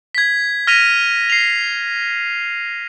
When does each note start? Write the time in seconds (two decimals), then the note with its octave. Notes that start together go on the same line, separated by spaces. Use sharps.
0.15 G#6 B6
0.67 F6 A#6 B6 D#7 F7
1.30 C7 F7